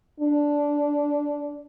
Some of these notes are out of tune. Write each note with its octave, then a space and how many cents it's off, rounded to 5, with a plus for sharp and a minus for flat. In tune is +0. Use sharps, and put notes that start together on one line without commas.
D4 -10